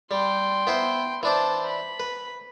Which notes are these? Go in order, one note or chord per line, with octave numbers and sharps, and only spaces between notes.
G3 G5 C6
B3 E4 C5
E3 D4 C5 A5 D6
B5
B4